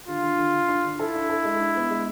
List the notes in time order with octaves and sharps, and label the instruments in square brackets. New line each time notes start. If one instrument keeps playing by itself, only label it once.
[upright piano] D3 [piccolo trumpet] F4
[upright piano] D3
D3
D3
D4
D3
[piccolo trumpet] E4 [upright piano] A4
[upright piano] D4
A4
G#3
D4
B3
G#3